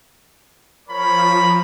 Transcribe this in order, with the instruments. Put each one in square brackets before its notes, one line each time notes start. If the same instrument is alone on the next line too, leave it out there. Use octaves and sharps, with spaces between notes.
[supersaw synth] F3 [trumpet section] A#4 C#5 B5